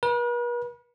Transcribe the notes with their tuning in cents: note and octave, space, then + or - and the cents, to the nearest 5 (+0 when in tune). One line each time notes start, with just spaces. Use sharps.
B4 -45